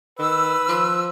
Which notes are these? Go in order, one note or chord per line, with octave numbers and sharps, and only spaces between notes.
D#3 B4 E6
F3